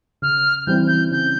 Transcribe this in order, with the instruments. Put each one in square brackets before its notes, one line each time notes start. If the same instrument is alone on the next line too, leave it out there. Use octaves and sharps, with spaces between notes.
[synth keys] C#3 [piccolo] F6
[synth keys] E3 G3 C4 E4 [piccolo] G6
[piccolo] G6
[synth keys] C#3 [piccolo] G6